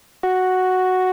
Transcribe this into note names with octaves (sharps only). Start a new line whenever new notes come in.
F#4